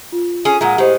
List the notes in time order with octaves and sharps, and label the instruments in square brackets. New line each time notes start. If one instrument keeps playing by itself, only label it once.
[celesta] F4
[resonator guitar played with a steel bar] C#4 G#4
[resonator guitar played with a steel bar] A#2 G#3 [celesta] F#5 A#5
[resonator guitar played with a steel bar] A2 G#3 [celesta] G4 C5 D#5